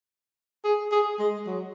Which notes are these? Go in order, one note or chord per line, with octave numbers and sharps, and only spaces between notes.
G#4
G#4
G#3
F#3